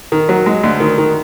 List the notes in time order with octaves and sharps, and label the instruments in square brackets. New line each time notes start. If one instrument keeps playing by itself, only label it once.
[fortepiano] D#3
F#3
G#3
D2
D#3
D#3